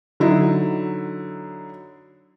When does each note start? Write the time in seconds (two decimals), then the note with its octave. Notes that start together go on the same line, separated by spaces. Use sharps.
0.20 D3 F#3 D#4 E4